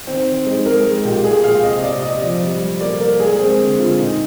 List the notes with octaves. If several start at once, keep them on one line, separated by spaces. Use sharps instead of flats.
D#3 C4
D#3
G#3 D#4
G#3 A#4
G#3
A#2 G4
G#3 G#4
A#2 F5
C3 D#5
C3 D5
C3 D#5
F3 D5
G3
G3
A#3 D5
A#3 A#4
G#3 G#4
G#3 C4
D3
D3 F4
A#2 D#4